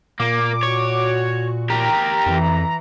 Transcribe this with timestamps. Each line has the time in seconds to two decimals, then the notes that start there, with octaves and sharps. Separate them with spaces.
0.20 A#2 A#3 D6
0.63 F#4 C#5
1.70 G4 A#4 A#5
2.26 F2 E3